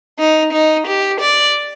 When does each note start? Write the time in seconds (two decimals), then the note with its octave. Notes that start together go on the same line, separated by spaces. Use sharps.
0.19 D#4
0.53 D#4
0.87 G4
1.21 D5